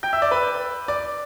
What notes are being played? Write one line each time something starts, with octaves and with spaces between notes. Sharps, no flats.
G5 G6
E5 E6
D5 D6
B4 B5
D5 D6